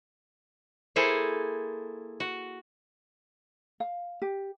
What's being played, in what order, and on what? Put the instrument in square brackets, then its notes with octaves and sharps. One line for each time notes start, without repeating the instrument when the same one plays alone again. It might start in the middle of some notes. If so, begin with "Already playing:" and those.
[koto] A#3 E4 G#4 A4 C5
F#4
[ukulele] F5
G4